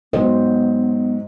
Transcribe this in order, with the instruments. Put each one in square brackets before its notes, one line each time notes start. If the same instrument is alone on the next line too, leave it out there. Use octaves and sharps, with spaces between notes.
[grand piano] G#2 F#3 [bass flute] B3 [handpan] C5 [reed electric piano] D#5